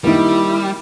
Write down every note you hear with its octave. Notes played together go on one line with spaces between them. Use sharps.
D#3 G3 A#3 E4